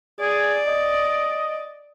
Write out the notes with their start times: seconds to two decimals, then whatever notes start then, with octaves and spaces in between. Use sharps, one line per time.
0.20 G#4 D5
0.67 D#5